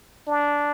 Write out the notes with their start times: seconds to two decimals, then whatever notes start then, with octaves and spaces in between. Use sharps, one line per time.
0.28 D4